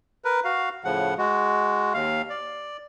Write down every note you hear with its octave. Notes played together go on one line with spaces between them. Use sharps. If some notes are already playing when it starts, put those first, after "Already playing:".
A#4 B4
F#4 F5
A2 C#3 F3 F#5
G#3 F#4
D#2 F5
D5